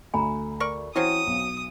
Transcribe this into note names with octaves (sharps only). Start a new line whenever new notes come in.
D2 A3 G#5 A#5 B5
A#4 D5 C#6
E3 F#3 C4 C#4 D#6
B1